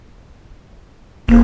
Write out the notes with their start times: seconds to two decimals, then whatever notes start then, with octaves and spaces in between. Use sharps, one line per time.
1.28 E1 A#3